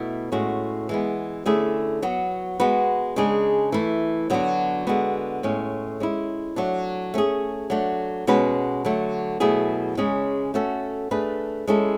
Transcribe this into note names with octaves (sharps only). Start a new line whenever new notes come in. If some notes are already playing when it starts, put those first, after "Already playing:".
Already playing: B2 A3 E4
A2 G#3 C#4 F#4
E3 G#3 B3
D3 A3 C#4 E4 G#4
F#3 B3 F#4
G#3 B3 F#4 B4
C#3 G#3 D4 G#4
E3 A3 E4
D3 F#3 B3 D4 F#4
D3 G#3 B3 F#4
A2 G#3 C#4
G#3 C#4 E4
F#3 A3 D4
A3 C#4 G#4
F#3 A3 D4
B2 G#3 C#4 F#4 B4
D3 F#3 A3
B2 F#3 A3 E4 G#4
C#3 G#3 C#4 G#4
A3 C#4 F#4 A4
A3 D4 G#4 B4
G#3 C#4 E4 A4